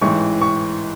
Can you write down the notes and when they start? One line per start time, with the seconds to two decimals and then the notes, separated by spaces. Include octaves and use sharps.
0.01 A1 G#2 E3 C#6
0.41 C#6